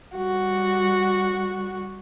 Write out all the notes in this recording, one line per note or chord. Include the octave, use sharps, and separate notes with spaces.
G3 F#4